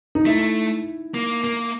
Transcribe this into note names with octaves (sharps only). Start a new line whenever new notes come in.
D#4
A3 E4
A#3
A#3